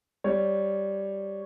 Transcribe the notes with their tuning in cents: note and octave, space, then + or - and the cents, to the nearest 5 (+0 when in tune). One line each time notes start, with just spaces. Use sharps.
G3 +0 C#5 +0